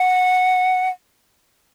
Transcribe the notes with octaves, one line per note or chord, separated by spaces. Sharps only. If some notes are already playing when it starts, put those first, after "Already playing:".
Already playing: F#5